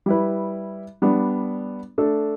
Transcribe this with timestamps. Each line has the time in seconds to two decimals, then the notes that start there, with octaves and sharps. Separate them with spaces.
0.06 G3 E4 B4
1.02 G3 B3 D4
1.98 A3 D4 A4